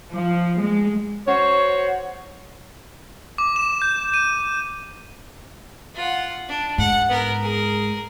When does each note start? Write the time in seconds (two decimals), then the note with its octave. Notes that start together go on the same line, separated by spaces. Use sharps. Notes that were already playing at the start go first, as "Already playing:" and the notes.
0.11 F3
0.60 G#3
1.27 F#4 C5 C#5
3.38 D6
3.56 E7
3.82 G6
4.14 D#7
5.95 F4 F#5
6.49 D4
6.78 G#2 F#5
7.09 B3 A#4
7.41 G#4 A#4